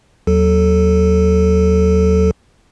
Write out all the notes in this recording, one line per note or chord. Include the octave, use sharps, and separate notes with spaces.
D#2 F#3 A4